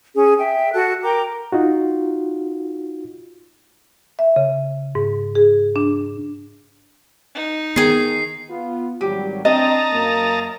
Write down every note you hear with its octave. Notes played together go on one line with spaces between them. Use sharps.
C#4 G#4
E5 G5
F#4 A4 F#6
A#4 G5 A#5 D6
D#4 F4 F#4
E5
C#3
G#2
G#4
D4
D#4
D#3 B3 G#4 C7
B3 F4
G#1 F#3 G3 G4
C4 D4 D#5 A5 A#5 D#6
F#2 A#3